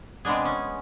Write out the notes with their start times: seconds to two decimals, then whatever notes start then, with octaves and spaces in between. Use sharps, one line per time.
0.25 C3 G#3 B3 D4 G#4
0.45 C#4